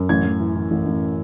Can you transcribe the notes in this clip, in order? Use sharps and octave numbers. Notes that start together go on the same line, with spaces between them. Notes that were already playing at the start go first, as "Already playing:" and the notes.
Already playing: F#2
A1 G#6
A1
E3
E3
A1
A1